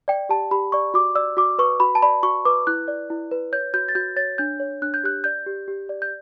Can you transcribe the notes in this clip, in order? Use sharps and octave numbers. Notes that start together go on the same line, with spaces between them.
D5 G5
G4 A5
G4 B5
D5 C#6
F#4 D6
D5 E6
F#4 D6
B4 C#6
F#4 B5
A5
D5 B5
F#4 C#6
B4 D6
E4 F#6
D5
E4
B4
C#5 G6
F#4 G6
A6
F#4 G6
C#5 A6
D4 G6
C#5
D4 F#6
G6
G4 F#6
D5 G6
G4
G4
D5
G6